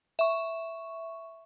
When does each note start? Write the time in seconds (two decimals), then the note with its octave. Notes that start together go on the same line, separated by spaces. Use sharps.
0.19 E5 C#6